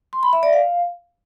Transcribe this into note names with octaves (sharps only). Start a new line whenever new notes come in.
C6
B5
E5
D5
F5